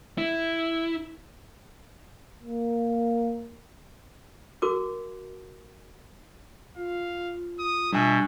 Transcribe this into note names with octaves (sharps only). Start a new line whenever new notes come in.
E4
A#3
F#4 A#4 D6
F4 F5
D#6
G2 B2 E5 G#5